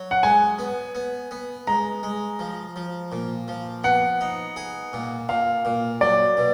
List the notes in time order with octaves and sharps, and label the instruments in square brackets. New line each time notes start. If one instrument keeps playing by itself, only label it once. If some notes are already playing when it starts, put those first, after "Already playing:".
Already playing: [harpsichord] F#3
[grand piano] F#5
[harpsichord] G#3 [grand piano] G#5
[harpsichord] B3
B3
B3
[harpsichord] G#3 [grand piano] A#5
[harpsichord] G#3
F3
F3
A#2
F3
[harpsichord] B3 [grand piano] F#5
[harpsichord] D#4
G#4
A#2
[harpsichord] A#2 [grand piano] F5
[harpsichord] A#2
[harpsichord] F#3 [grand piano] D5
[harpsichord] B2